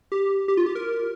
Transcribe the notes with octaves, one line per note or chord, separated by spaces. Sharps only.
G4
G4
F4
G4
A#4